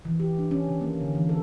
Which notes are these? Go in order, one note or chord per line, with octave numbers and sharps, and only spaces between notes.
E3
G4
D4
C#4
D#3
A#3
D3
E3
A4